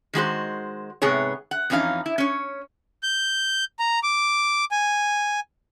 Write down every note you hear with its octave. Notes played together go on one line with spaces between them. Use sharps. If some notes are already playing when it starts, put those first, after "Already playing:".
D#3 G#3 F#4 C5
G#2 C3 B3 G#4 C#5
F#5
F2 E3 C#4 D#4 F5
E4
C#4 C#5
G6
A#5
D6
G#5